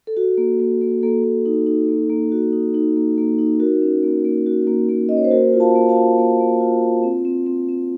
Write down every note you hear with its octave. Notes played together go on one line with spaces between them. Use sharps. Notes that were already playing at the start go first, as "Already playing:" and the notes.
A4
F#4
A#3
A#3
A#3
A#3 A4
A#3
D#4
D#4
A#3
A#3
F#4
D#4
D#4
A#3
A#3
D#4
F#4 A#4
C#4
A#3
A#3
F#4
A#3
A#3
C#4 D#5
C#5
C5
A#3 F#4 A#4
F4
F5 A5
A#3
F5 A5
F4
A#3
A#3
F4
F4
C4
C4
C4
C4